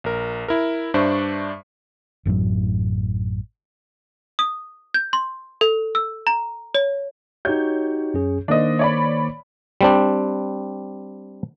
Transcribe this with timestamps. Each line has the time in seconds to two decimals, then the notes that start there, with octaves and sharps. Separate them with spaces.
0.04 A#1 A#4
0.48 E4 A#4
0.94 G2 D4 C5 D5 E5 C#6
2.25 A1 F#2 A2 F#3
4.39 D#6
4.94 G6
5.13 C6
5.61 A4
5.95 E6
6.27 A#5
6.75 C#5
7.45 D#4 F#4 G4 C#5 G6
8.14 F#2 C#4 G#4
8.48 D#3 A#3 D4 C5 D#5
8.79 C#5 D5 B5
9.81 G3 C4 D4